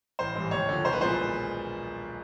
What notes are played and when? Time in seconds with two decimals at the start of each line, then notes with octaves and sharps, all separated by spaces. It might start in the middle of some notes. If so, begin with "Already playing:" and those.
0.19 A1 C5
0.35 G#2 E3 G3
0.51 D#2 C#5
0.69 D3 F3
0.84 B1 C5
0.93 B4
1.01 A#2 F3 G#3 C5